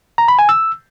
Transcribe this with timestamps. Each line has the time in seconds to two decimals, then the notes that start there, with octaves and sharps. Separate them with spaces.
0.18 A#5
0.28 B5
0.39 G#5
0.49 E6